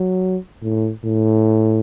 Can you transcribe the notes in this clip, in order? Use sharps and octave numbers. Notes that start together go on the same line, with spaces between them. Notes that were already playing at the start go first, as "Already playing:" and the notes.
Already playing: F#3
A2
A2